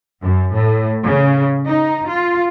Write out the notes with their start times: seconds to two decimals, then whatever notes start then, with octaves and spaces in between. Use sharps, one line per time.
0.22 F#2
0.54 A2
1.03 C#3
1.66 D#4
2.09 F4